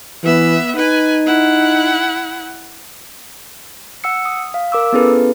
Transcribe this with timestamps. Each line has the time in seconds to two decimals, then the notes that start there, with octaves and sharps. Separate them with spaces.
0.24 E3 B3 E5
0.76 D#4 B4 G#5
1.27 E4 F#5
4.04 F#5 E6 C#7
4.25 D#6
4.54 F5
4.72 A#4 D6 E6
4.93 B3 C#4 E4 G#4 A4 B4